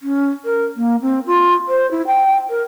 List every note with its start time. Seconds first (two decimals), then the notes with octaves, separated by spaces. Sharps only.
0.01 C#4
0.45 A#4
0.77 A#3
1.02 C4
1.26 F4
1.68 C5
1.91 E4
2.07 G5
2.50 A#4